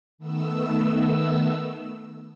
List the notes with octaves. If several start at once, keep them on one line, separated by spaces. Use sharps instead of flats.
D#3 A3 B3 E6